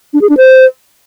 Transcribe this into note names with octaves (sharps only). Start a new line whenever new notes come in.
D4
G#4
D4
C5